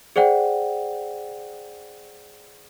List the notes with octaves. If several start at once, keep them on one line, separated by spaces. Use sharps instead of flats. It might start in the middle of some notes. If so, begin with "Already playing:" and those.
G#4 C5 D5 F#5 G5